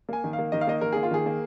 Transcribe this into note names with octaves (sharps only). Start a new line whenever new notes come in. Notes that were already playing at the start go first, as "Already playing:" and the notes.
A#3 G#5
D#3
F5
A#3
D#3 D#5
F5
A#3 D#5
D#3 A#4
A#3 G#4
F4
D#3 G#4
A#3